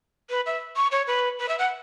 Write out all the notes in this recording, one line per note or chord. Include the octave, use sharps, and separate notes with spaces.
B4
E5
C#6
C#5
B4
B4
E5
F#5